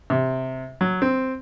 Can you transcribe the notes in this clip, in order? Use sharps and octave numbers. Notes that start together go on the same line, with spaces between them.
C3
F#3
C4